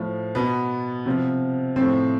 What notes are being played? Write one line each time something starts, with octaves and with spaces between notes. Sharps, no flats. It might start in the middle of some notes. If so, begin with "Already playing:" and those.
Already playing: A2 F3
B2 B3
C3 F3
A2 F3 C4